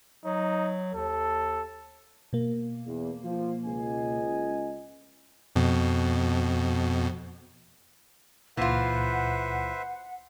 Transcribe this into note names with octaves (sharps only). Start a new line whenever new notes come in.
F#3 D#4
D#2 A4
B2 A#3
E2
F3
C#2 D#5 G#5
F2 B2
C#2 A#2 E3 F4 B4 C5 E5 F#5